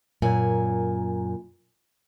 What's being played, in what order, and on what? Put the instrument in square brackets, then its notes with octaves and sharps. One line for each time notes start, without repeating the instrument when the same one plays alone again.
[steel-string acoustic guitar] F#2 A#2 G#5